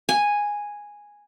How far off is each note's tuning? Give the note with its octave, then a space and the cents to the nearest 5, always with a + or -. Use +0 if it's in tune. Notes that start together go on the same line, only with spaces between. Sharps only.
G#5 -5